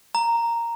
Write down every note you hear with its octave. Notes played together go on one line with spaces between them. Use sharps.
A#5